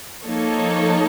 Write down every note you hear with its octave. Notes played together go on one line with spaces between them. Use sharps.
F3 A#3 D#4 A4 C#5